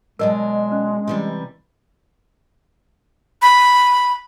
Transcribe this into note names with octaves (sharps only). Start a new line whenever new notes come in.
B2 F#3 G#3 D4 A#4 D#5 A5
C#4
C3 E3 G3
B5